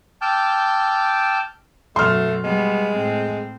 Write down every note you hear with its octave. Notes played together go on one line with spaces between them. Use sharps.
G5 A5 D6 E6 F6 G6
F#2 B2 A3 C6 F6
G3 G#3 B3
A2 C4